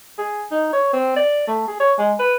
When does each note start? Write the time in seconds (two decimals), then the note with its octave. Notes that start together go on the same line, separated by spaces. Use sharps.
0.18 G#4
0.52 D#4
0.73 C#5
0.93 C4
1.16 D5
1.48 A3
1.68 G#4
1.80 C#5
1.99 G#3
2.19 B4